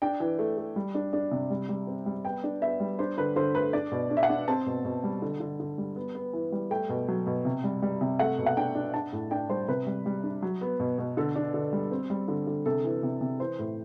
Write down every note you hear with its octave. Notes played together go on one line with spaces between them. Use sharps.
D4 G5
E3
A3
A3
G3
D4
D4
C3
G3
G3
C4
G3
B3 G5
D4
B3 E5
G3
D4 C5
D3 B4
D3 C5
A3 B4
D4 D5
B2
D4
E5
F#5
D4
C4 A5
B2
B2
G3
D3
D3
D3
G3
B3
B3
E3
G3
A3 G5
B2
F#3
B2
C3
G3
G3
C3
A3 F#5
B2
F#5
D4 G5
D4
D4 A5
A2
D4 G5
G3 C5
C3 B4
G3
G3
D4
F#3
B3
B2
B2
D3 A4
D4
D3
G3
C4
G3
D3
D3
C3 A4
E3
C3
C3
E3 C5
A2